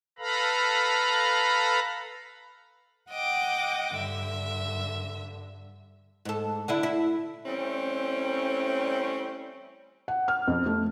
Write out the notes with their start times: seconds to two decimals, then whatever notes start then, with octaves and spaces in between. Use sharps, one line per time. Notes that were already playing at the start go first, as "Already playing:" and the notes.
0.19 A4 B4 F5 A#5 B5
3.11 D#5 F#5 G5 D6
3.97 G2 D3 E5
6.25 G#2 A4
6.68 D3 D4 E4
6.83 E4
7.46 E3 G3 A3 C4 C#4
10.08 F#5
10.28 F6
10.47 F2
10.66 A3